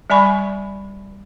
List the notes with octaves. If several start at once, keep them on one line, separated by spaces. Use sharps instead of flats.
G3 D5 G#5 B5 C#6